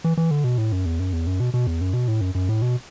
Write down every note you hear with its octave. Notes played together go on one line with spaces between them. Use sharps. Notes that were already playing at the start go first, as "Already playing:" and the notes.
E3
E3
D3
B2
A2
F#2
E2
F#2
E2
F#2
B2
B2
E2
F#2
B2
A2
F#2
F#2
A2
B2